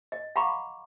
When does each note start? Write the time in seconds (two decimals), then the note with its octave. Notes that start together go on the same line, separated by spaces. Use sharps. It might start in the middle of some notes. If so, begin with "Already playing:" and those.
0.12 D#5
0.36 F5 F#5 A#5 B5 C#6 D6